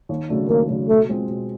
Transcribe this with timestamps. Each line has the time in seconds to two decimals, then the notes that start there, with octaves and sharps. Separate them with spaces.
0.09 D#2
0.29 C#3 F#3 A3 D4
0.49 D#2 A#3
0.69 C#3 F#3 A3 D4
0.88 B2 A3
1.09 G#3 C4 F4
1.29 B2